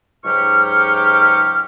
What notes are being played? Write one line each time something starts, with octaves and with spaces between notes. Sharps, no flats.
C#2 G#2 F#3 G4 C#6 F6